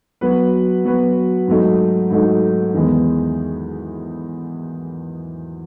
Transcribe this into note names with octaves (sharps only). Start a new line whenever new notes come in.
F#3 B3 F#4 B4
F#3 B3 F#4 B4
G#2 F#3 A3 D#4
G#2 F#3 A3 D#4
E2 D#3 G#3 B3